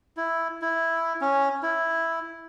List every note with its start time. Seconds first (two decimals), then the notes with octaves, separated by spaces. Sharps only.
0.17 E4
0.62 E4
1.21 C#4
1.63 E4